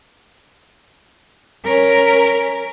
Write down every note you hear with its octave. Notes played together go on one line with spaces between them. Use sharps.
C#4 A#4 B6